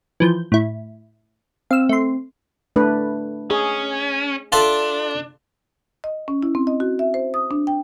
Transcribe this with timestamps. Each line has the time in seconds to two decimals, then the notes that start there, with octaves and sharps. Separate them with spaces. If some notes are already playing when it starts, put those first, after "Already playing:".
0.20 E3 F3 G6
0.52 A2 E4
1.71 C4 F5 E6
1.89 A3 C6
2.76 A3 D4 B4
3.51 C#4 G#4
4.52 D4 F4 A4 E5
6.04 D#5
6.28 C#4
6.43 E4
6.55 C4
6.67 D#5
6.80 F#4
6.99 E5
7.14 C5
7.34 D#6
7.51 D4
7.67 G5